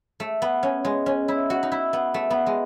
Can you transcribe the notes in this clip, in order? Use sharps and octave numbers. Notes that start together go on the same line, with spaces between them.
A3
B3
C#4
G#3
C#4
E4
F#4
D#4
E4
B3
A3
B3
G#3